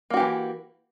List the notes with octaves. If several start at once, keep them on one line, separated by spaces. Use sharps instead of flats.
E3 A#3 F#4 G4